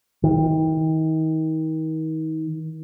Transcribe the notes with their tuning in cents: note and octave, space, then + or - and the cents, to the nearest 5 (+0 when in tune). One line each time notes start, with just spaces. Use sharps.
D#3 +35